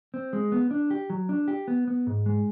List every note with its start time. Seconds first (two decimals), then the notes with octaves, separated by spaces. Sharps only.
0.14 C4
0.33 G#3
0.52 B3
0.71 D4
0.90 G4
1.10 F#3
1.29 D4
1.48 G4
1.68 B3
1.87 B3
2.07 G#2
2.26 G#3